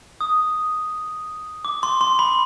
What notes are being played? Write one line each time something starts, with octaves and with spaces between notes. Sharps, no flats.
D#6
D6
C6
C6
B5